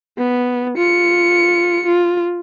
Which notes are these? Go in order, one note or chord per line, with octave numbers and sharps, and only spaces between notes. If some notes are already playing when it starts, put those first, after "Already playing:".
B3
F4 C#7
F4